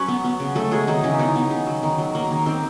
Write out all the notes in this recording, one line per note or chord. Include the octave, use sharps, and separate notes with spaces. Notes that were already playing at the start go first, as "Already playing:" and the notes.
Already playing: F#3 C#4 B4 C#5
B3
B3
C#3
F#3 A3 A4
F#3 G#3 G#4
D#3 F#3 D#4
C#3 E3 E4
D#3 B3 D#4
B3
C#3
F#3
D#3
F#3
A#3
D#3
D#3 C4